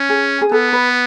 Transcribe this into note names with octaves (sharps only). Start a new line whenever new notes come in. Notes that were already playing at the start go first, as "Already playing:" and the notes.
Already playing: C#4
G#4
G#4
B3 A4
B4